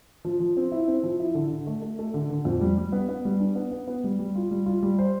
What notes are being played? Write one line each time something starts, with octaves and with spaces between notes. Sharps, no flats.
F3
F3
C4
E4
C4
F3
E4
D3
D3
A3
A3
A3
D3
D3
F2
G3
G3
B3
B3
G3
D4
B3
B3
B3
G3
G3
F4
G3
F4
G3
C5